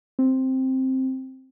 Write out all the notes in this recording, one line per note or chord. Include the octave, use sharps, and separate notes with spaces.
C4